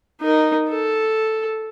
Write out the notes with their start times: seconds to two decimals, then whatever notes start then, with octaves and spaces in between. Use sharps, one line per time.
0.22 D#4 A#4
0.69 A4